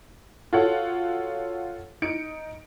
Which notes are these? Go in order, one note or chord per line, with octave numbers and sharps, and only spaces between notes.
F4 F#4 A4 C#5 F#5
D#4 C#7 D7